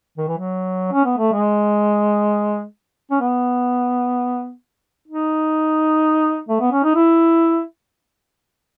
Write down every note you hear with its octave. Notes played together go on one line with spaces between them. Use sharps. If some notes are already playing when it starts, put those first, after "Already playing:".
D#3
E3
F#3
C#4
B3
A3
G#3
C#4
B3
D#4
A3
B3
C#4
D#4
E4